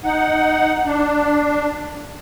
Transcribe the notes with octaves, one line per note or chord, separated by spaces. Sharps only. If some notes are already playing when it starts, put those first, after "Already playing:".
D#4 F#5
D4